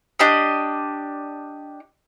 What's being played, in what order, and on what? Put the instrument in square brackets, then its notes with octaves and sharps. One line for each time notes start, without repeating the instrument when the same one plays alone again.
[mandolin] D4 G4 D#5